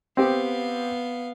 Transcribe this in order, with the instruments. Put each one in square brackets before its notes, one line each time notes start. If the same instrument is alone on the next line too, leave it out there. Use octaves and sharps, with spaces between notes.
[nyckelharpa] B3 F5 [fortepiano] C4 G4